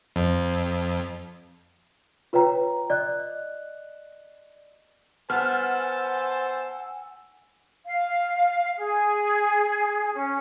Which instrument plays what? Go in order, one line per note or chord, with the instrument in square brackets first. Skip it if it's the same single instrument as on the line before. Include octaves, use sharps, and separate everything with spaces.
[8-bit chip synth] F2
[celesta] F4 B4 C#5 G5 A#5
D5 D#5 F#6
[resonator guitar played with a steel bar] B3 [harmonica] C5 A5 [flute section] F#5 G#5 E6 [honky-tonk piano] F6
[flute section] F5
G#4
C#4